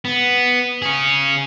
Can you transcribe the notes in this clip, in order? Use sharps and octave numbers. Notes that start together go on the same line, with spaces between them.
B3
C#4 G#4